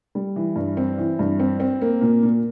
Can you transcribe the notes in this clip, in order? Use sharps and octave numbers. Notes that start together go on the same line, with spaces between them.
G3
E3
G2
C4
E3
G2
C4
C4
A#3
A#2
A#2